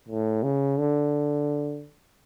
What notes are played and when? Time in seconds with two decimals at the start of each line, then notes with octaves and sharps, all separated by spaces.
0.09 A2
0.43 C#3
0.79 D3